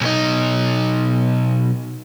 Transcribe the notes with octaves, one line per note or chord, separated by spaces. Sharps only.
B1 D#4